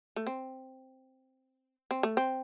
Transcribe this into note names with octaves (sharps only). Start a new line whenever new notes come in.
A3
C4
C4
A3
C4